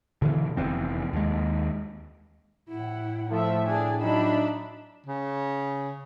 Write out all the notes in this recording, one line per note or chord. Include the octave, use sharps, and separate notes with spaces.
B2 D3 E3
F1 E2 C4
D#2 G#3
A2 E4 F#5
F3 A3 E5
D4 G#4 G#5
F#3 D4 D#4 E5 B5
C#3